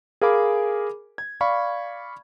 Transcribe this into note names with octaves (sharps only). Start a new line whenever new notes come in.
G#4 A#4 F5 G#5 B5 D6
G#6
D5 F5 B5 C#6